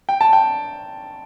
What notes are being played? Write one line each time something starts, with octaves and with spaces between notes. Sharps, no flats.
G5
A5
G5